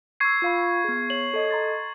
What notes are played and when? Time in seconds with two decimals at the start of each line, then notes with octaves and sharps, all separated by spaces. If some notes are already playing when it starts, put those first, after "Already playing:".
0.20 C#6 D6 E6 G#6 C7
0.42 F4 F5 B5
0.84 B3 G#4
1.10 C#5 F#7
1.34 A4 D#5
1.50 A#5 C6 A6